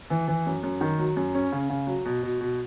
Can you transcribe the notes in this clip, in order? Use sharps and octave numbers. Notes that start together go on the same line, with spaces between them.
E3
E3
F#2
F#2
D#3
F#3
F#2
C#4
C#3
C#3
F#3
B2
B2
B2